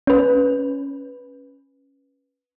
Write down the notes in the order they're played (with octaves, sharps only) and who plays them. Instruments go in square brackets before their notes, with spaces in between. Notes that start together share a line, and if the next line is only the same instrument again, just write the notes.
[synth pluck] C#4 B4